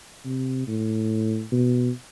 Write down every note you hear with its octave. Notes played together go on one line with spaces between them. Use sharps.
C3
A2
B2